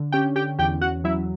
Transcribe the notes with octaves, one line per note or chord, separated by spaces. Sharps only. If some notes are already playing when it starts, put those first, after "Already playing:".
Already playing: D3
C#4 G4 G5
G4 G5
E2 G4 G5
F#4 F#5
F#3 E4 E5